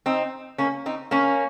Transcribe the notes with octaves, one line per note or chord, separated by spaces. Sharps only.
C4 D#4
A#3 C#4
C4 D#4
A#3 C#4